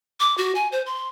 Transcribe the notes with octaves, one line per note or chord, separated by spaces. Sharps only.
D6
F#4
G#5
C5
C6